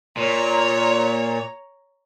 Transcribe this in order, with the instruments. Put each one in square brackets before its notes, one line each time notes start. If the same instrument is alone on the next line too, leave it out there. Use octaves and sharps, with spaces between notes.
[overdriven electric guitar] A#2 [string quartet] C#5 A#5